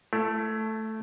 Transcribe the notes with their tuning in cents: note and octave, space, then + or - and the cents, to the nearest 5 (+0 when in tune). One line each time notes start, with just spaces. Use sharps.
A3 +0 E4 +30